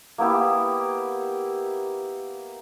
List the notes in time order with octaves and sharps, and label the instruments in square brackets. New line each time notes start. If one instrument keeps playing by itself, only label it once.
[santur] A#3 B3 E4 G4